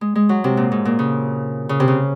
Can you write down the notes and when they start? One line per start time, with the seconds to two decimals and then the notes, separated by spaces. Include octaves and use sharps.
0.01 G#3
0.15 G#3
0.29 F#3
0.44 C3
0.57 A#2
0.72 G#2
0.85 A#2
0.99 C#3
1.69 C#3
1.80 C3
1.88 C#3